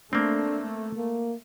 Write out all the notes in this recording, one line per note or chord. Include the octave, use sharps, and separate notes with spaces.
A3 A#3 C4 D4
A#3